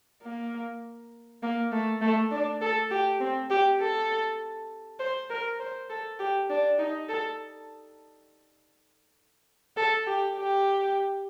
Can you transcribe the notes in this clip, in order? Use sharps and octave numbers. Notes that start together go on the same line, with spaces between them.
A#3
A#3
A3
A3
D4
A4
G4
C4
G4
A4
C5
A#4
C5
A4
G4
D4
D#4
A4
A4
G4
G4